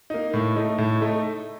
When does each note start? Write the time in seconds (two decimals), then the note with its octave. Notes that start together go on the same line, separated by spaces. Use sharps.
0.10 A#3 D#4
0.34 A2
0.56 A3 D#4
0.78 A2
1.01 A3 D#4